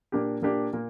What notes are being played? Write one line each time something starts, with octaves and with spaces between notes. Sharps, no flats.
A#2 A#3 D4 G4
A#2 A#3 D4 G4
A#2 A#3